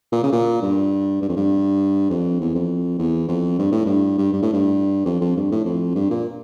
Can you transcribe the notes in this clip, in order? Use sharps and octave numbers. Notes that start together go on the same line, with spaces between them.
A#2
C#3
A#2
G2
G2
F2
G2
F2
E2
F2
E2
F2
G2
A2
G2
G2
G2
A2
G2
F2
F2
G2
A2
F2
G2
A#2